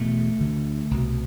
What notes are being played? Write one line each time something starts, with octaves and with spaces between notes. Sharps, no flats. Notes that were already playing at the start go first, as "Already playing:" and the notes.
Already playing: E1 E2 B2 A3
D2 D3
C2 B2